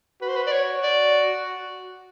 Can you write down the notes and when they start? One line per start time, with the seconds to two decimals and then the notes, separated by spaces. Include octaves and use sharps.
0.22 F#4 B4
0.28 C5
0.36 B4
0.47 D5
0.52 C#5
0.83 D5